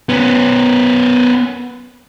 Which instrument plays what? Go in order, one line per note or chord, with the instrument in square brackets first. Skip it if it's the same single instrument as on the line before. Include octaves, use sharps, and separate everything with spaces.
[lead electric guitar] B3 C#4